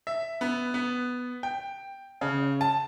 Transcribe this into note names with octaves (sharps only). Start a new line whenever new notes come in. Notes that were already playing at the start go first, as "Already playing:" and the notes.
E5
B3
B3
G5
C#3
A5